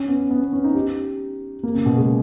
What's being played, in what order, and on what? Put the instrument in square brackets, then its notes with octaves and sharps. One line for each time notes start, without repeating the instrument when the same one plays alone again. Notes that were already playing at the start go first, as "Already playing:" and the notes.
Already playing: [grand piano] C#4
B3
B3
B3
C#4
D#4
G4
A#3
C#3
B2
G#3